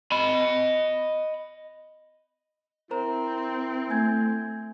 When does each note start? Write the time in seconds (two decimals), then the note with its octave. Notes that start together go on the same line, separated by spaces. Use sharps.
0.12 D#5 B5
2.91 C4 E4 A#4 C5 A#5
3.90 A3 G#5 G6 G#6